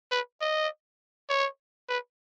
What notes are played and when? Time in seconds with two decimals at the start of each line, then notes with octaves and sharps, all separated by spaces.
0.12 B4
0.41 D#5
1.29 C#5
1.89 B4